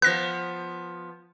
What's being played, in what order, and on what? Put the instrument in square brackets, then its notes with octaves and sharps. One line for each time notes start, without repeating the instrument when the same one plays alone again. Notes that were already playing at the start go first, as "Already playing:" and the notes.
[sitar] F3 B3 [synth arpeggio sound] F#6 A#6